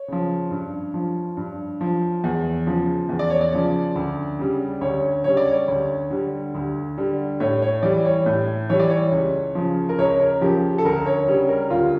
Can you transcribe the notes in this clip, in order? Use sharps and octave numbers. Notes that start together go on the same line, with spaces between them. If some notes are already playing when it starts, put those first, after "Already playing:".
Already playing: C#5
C#3 F3
G2
F3
G2
F3
E2
C#3 F3
E2
D5
C#5
D5
C#3 F3
D2
C#3 G3
D2 C#5
C#3 G3 C#5
D5
C#5
D2
D3 G3
D2
D3 G3
A2 C#5
C#5
E3 G3 D5
C#5
A2
E3 G3 C#5
D5
C#5
C#2
C#3 F3
A#4
C#2 C#5
A#4
C#3 F3 G4
A4
D2 A#4
C#5
C#3 G3 C#5
A#4
D2 F4